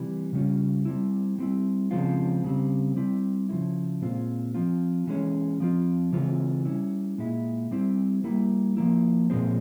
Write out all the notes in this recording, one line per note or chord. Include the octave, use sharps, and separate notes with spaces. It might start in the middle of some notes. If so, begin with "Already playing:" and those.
Already playing: C3 E3 G3
C#3 G3 C#4 F4
G3 C4 E4
G3 C4 E4
C#3 F3 G#3 C4 F4
C#3 G3 C4
G3 C4 E4
C#3 F3 G#3 E4
A#2 G#3 C4 F4
F3 C4 F4
E3 G#3 C#4
F3 C4 F4
C#3 E3 G#3 C4 F4
G3 C#4 E4
A#2 G#3 E4
G3 C4 E4
G3 A#3 E4
F3 A#3 E4
A#2 F3 G#3 C4